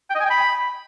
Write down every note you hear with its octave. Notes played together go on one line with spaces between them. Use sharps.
G5
D#5
G#5
G5
B5